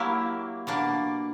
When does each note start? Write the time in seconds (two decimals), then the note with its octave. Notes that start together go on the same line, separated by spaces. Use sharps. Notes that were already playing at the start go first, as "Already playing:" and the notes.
Already playing: F#3 A#3 E4 G4
0.67 B2 A#3 D4